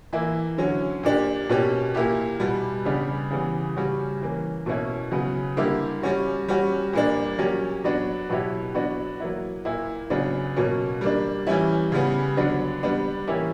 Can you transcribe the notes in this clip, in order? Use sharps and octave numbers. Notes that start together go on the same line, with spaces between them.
E3 A#3 E4
D3 F#3 C#4
A#2 A#3 D4 G4
B2 A#3 C#4 G4
A#2 A#3 E4 G4
B2 G3 B3
C#3 G3 B3 D4 G4
C#3 E3 G3 B3
C#3 G3 C#4 F#4
E3 A#3 C#4
B2 A#3 C#4 E4
C#3 F#3 B3
D3 G3 A#3 E4 G4
G3 C#4 F#4
G3 C#4 F#4
A#2 G3 A#3 D4
F#3 A#3 C#4 G4
F#3 B3 D4 F#4
B2 F#3 B3 E4 G4
F#3 B3 D4 F#4
F#3 A#3 E4
A#2 A#3 E4
C#3 F#3 B3 D4
B2 F#3 A#3 C#4
G3 A#3 D4
E3 G3 C#4 E4
C#3 G3 B3
D3 F#3 B3 D4
G3 B3 D4
E3 A#3 C#4 E4 G4